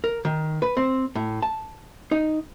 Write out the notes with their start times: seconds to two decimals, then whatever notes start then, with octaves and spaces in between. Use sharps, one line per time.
0.04 A#4
0.25 D#3
0.62 B4
0.77 C4
1.16 A2
1.42 A5
2.11 D#4